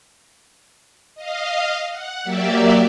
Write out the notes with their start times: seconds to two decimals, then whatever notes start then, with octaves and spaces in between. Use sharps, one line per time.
1.15 D#5 F5
1.90 F#5
2.23 F#3 A#3 G4 D5 E5